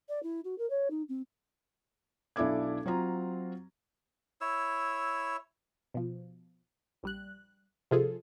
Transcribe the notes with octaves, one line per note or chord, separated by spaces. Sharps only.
D5
E4
F#4
A#4
C#5
D#4
C4
B1 D4 E4 A4 D6 G#6
F#3 C4 F4 A#5
E4 C#5 E6
B2 F3
A#1 G3 F#6
C3 F3 F4 G#4 A4